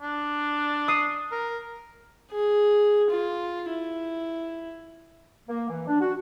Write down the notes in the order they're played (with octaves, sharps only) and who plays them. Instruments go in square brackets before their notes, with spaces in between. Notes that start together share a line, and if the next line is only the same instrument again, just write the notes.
[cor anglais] D4
[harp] D#6 C7 D#7
[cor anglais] A#4
[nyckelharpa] G#4
F4
E4
[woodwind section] A#3
E3
D4
F#4